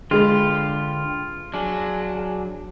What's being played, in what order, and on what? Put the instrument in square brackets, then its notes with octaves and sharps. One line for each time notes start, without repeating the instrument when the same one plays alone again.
[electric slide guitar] D3 B4 [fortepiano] G#3 [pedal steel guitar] F4 [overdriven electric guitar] G4
[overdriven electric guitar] F#3 [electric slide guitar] D4 G#4